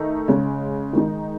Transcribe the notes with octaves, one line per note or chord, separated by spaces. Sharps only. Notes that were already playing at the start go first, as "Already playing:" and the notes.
Already playing: D#3 A3 D#4
C#3 G#3 C#4
D#3 G#3 D#4